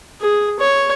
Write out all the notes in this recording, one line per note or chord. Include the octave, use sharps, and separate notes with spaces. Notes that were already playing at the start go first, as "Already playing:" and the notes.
G#4
C#5